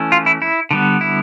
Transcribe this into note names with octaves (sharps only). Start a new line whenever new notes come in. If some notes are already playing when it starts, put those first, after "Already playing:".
Already playing: E3 A3 C#4
F4
E4
E4
D3 G3 B3
E4